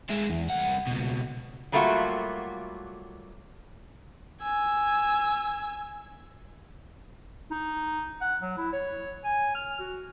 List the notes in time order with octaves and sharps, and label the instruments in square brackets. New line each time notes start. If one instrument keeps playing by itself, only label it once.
[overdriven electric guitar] G#3 E4
E2
C2 F#5
C#2 B2
[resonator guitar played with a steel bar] F#3 G3 A3 A#3 F4 F#4
[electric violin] G#5 E6
[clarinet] D#4
F#5
F#3
E4
C#5
G#5
F6
F#4